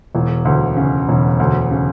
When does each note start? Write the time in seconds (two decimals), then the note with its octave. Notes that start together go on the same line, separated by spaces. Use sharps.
0.15 E1
0.45 D2
0.77 C#3
1.08 E1
1.40 D2
1.71 C#3